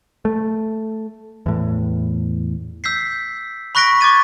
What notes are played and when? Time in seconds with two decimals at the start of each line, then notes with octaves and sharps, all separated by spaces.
0.25 A3
1.46 E2 A2
2.84 E6 G6 B6 C7
3.75 B5 C#6 F#6 A#6 B6 D7
4.01 C#6 D6 G#6 A6 D#7